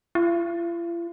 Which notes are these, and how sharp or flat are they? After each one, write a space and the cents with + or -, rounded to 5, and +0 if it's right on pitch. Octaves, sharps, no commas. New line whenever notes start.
F4 -45